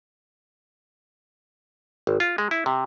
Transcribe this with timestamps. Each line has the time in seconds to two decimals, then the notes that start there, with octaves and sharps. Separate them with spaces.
2.07 G#1
2.20 F4
2.38 G#3
2.51 E4
2.66 C3